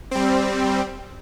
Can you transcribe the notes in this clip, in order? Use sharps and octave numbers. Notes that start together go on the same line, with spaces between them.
G3 C4